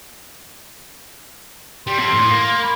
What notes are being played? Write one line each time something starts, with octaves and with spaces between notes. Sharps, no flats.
G3 C6
C4 A4
A2
A#3
B5